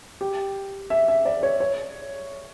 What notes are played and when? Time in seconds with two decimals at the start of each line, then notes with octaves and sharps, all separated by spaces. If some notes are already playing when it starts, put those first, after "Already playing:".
0.21 G4
0.90 E5
1.08 E5
1.25 D5
1.43 C#5
1.60 C#5